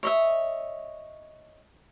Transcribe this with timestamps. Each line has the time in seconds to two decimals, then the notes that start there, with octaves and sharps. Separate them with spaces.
0.03 C#5 D#5 E5